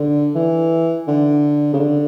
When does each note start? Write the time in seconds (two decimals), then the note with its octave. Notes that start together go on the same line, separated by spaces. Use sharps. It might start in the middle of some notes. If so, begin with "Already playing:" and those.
Already playing: D3
0.35 E3
1.08 D3
1.73 C#3
1.79 D3